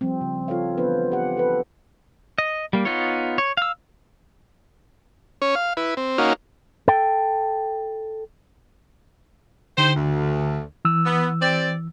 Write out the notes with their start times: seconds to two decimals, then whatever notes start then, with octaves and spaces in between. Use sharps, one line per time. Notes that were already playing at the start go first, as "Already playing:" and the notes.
0.01 F3 G3 C4
0.21 C#3
0.48 F4 A4 C#5 F5
0.78 E3 B3 D4 B4 C5
1.12 G4 F#5
1.37 A4 B4
2.38 D#5
2.73 G3 A#3
2.85 B3 D#4 F4 C#5
3.38 C#5
3.57 F5 E6
5.42 C#4 C#5
5.55 F5
5.77 E4 B4
5.97 C4
6.18 A#3 C#4 D#4 F#4 F5
6.88 A4 G5
9.78 D3 D#4 G4 C5
9.96 D2
10.85 E3 E6
11.06 B3
11.41 C4 G4 D5